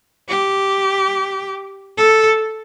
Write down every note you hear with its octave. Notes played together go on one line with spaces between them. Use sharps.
G4
A4